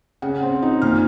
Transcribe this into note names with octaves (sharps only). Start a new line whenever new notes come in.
C#3 F#5
C4
D#4
A#2 F6